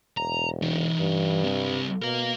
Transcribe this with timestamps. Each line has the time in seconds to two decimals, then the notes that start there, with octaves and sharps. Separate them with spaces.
0.17 E1 A#5
0.62 E3 D#4
0.98 G2
1.44 C2 C3
2.02 B2 A#4 F5